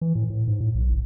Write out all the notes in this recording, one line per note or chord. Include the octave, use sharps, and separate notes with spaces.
E3
A2
A2
G#2
A2
B1
F#1